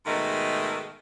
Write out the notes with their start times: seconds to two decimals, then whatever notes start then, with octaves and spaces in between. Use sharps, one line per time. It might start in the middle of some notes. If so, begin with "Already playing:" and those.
0.06 G#2 B2 D#3 G#3 A3